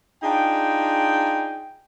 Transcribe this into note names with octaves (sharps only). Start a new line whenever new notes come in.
D4 D#4 F4 G#4 G5